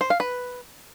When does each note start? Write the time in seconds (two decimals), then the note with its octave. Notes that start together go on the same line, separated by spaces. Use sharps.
0.01 C5
0.10 F5
0.20 B4